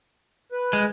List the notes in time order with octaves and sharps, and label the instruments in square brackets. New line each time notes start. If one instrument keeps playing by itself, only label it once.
[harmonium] B4
[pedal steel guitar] G#3